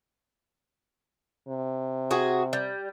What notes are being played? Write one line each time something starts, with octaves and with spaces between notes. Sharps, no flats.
C3
F#4 G#4
G3